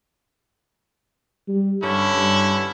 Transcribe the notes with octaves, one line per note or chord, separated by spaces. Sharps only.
G3
G2 D3 C#4 E4
G2